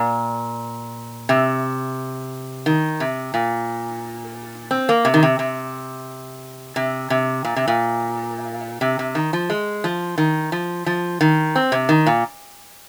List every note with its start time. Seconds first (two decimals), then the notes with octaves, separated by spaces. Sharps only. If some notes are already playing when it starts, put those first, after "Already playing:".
Already playing: A#2
1.29 C3
2.66 D#3
3.00 C3
3.34 A#2
4.71 C4
4.89 A#3
5.05 C3
5.14 D#3
5.23 C3
5.39 C3
6.76 C3
7.10 C3
7.44 A#2
7.56 C3
7.68 A#2
8.81 C3
8.99 C3
9.15 D#3
9.33 F3
9.50 G#3
9.84 F3
10.18 D#3
10.52 F3
10.86 F3
11.21 D#3
11.56 C4
11.72 C3
11.89 D#3
12.06 A#2